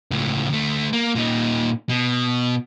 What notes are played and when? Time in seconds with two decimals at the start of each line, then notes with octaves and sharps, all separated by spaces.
0.11 C#2 A2
0.49 D2 A3
0.93 A#3
1.15 A#2 D#4
1.89 B2